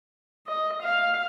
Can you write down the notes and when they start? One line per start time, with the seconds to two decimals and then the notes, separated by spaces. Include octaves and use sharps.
0.48 D#5
0.83 F5